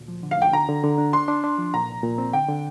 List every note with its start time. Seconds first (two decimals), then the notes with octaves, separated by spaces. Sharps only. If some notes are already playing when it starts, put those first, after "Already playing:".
Already playing: D2 A#2
0.08 F3
0.23 D3
0.31 F5
0.38 D2 G5
0.53 D3 A#5
0.68 D3
0.84 D3
0.98 D4
1.13 D4 C6
1.28 D4
1.44 D4
1.58 F3
1.74 A#2 A#5
1.88 C2
2.03 A#2
2.18 C4
2.33 D3 G5
2.48 D3